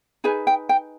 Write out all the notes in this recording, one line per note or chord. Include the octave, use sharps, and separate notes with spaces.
D#4 G#4 B4 G#5
G5
G5